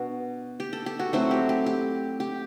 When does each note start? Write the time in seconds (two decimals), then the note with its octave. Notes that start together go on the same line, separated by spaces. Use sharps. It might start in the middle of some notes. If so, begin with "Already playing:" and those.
Already playing: B2 D4 F#4
0.60 G4
0.73 A4
0.86 G4
0.99 F#4
1.13 F#3 A3 C4 E4 F#4
1.31 G4
1.49 G4
1.66 G4
2.20 G4